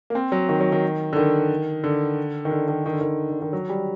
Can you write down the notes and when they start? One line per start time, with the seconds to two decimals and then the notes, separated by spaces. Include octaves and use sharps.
0.10 A#3
0.15 C4
0.32 F#3
0.49 D#3
0.60 F#3
0.72 D#3
1.13 D3
1.17 D#3
1.84 D3
2.45 D#3
2.51 D3
2.68 D#3
2.86 D#3
2.93 D3
3.01 D#3
3.30 D3
3.42 D#3
3.53 F#3
3.69 G3